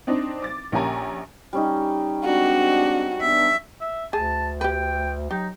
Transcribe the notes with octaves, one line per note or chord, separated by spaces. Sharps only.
C4 D4 D#4
D6 A6
A#1 A#3 C#4 G4 G#5 A#5
G3 C#4 D#4
G#3 C4 D4 F#4
B3 D4 E5
E5
D2 G#4 A5
G4 B4 G5
F#3 D#4 G4